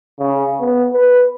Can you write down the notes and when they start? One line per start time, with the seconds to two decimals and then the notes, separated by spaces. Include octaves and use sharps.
0.19 C#3
0.60 B3
0.93 B4